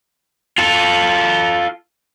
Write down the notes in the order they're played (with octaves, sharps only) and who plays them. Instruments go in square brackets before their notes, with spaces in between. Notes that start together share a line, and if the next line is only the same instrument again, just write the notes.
[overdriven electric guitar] F4 A4